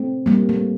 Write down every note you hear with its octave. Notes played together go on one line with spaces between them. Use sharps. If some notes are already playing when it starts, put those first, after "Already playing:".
Already playing: A3 C4
G3 A#3
A3